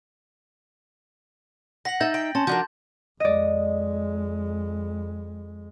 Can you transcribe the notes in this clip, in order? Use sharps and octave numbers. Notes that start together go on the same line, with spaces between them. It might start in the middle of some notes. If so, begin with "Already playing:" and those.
F#5 A#6 B6 F#7
D#4 D#5 E5 G6 A6
G5
C#4 A5 C6 A6
F3 D4 D#4 F#4 A#4 G6
F2 G#3 D5 D#5